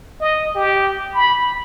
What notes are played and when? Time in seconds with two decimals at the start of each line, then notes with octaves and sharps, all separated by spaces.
0.21 D#5
0.55 G4
1.14 B5